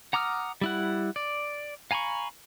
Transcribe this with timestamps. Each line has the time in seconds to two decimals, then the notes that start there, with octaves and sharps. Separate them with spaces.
0.13 F#5 A#5 D6 D#6 F6
0.61 G3 E4 F#5
1.16 D5
1.91 F5 G#5 A#5 B5 C#6